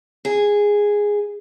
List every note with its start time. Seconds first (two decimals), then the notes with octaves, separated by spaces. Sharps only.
0.25 G#4